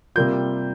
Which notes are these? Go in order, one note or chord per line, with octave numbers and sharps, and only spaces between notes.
C3 G3 A#3 F4 G6